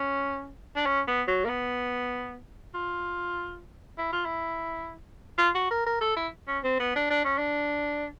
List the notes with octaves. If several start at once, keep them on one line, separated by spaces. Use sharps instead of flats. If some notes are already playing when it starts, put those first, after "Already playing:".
Already playing: C#4
D4
C#4
B3
F#3
A#3
B3
F4
E4
F4
E4
F4
F#4
A#4
A#4
A4
E4
C#4
C4
B3
D4
D4
C#4
D4